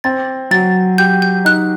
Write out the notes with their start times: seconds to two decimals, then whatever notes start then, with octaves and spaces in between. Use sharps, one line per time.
0.04 C4 A6
0.51 F#3 A6
0.98 G4 G6
1.22 G6
1.45 D#4 F#6